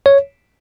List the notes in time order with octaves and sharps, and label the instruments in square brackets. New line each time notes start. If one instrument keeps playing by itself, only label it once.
[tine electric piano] C#5